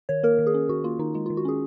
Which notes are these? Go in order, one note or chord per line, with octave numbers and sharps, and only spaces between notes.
D#3 C#5
A#3 A#4
D#3
G#4
C#4
D#3 F#4
A#3 F4
D#3 D#4
G#3 F4
D#3 F4
F#4
C#4 G#4